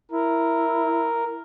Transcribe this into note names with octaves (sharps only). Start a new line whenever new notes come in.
E4 A#4